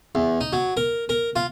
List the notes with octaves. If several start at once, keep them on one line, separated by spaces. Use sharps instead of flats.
E2
D#4
F#3
A#4
A#4
F4